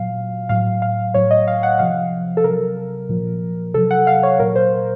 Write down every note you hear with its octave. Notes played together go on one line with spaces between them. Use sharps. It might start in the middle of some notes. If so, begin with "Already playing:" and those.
Already playing: A#2 F#3 F5
A2 F#3 F5
F5
A2 F#3 C#5
D#5
F5
F#5
C3 F3 F5
A4
C3 F#3 A#4
A#2 F3
C3 F#3 A4
F#5
F5
C#5
A#2 F#3 A#4
C5